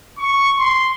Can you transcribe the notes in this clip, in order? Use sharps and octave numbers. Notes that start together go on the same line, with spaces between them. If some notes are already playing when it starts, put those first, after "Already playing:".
C#6
C6